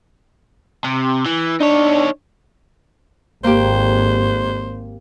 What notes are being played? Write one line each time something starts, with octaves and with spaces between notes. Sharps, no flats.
C3
E3
D4 D#4 C#5
G#1 A#3 G4 C5